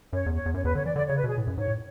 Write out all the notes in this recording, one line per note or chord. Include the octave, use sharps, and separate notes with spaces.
F#2 C#5
E2
C#5
E2
F#2 C#5
E2 B4
D3 C#5
E3 D5
D3 D5
C#5
C#3
B4
B2 G#4
A2
F#2
G#2 C#5
A2